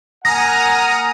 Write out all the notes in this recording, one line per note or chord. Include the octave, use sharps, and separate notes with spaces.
A#3 F#5 G#5 A#5 D#6 F6 A#6